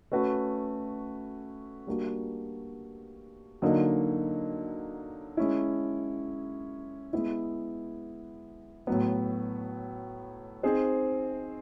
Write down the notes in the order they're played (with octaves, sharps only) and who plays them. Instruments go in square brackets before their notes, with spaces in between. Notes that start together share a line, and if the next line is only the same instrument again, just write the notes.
[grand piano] A3 C#4 F#4 B4
G3 A#3 D4 F#4
D3 F#3 A#3 D#4
G#3 C#4 E4
G#3 B3 E4
A2 F#3 B3
C4 D#4 G#4 C5